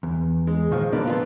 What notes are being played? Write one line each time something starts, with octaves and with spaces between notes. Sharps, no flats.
E2
G#3
A#2 D#3 F3
D3 A#3 B3 D5
F4 G#4 A4